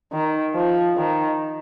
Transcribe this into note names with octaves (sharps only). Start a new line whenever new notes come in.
D#3
F3
D#3